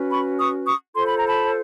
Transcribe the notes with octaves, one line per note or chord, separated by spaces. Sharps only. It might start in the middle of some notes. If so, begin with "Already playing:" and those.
Already playing: C#4 F#4 B4
B5 C#6
C#6 D#6
C#6 D#6
F4 A4 C5 C6
B5
A#5
A5 B5